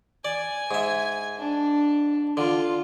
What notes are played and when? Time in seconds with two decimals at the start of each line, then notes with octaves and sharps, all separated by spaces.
0.25 D5 G#5
0.71 G#2 E5
1.38 D4
2.37 D3 F4